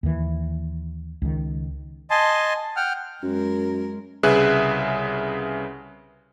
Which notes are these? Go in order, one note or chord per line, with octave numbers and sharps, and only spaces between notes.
D#2 D#3 E3
C#2 D#3
D#5 G#5 A5 C6
F#5 G5 F6
F#2 G#3 A#4
C2 C#3 G#4 B4 E5 F#6